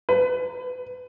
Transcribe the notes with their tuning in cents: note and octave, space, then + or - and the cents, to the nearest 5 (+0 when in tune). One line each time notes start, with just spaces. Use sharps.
B4 +30